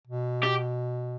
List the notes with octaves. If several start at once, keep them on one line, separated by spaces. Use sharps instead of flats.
B2
G4